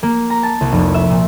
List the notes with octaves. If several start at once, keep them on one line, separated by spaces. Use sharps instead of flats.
A#3
A#5
A5
C2
F1
E5
A#2